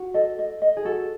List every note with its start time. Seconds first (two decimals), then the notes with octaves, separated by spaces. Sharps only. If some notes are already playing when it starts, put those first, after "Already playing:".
Already playing: F#4
0.14 A4 D#5
0.39 D#5
0.62 D#5
0.77 G#4
0.85 F#4 A4